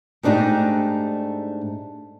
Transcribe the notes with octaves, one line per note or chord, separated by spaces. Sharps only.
G#2 A3 D4 D#4 G4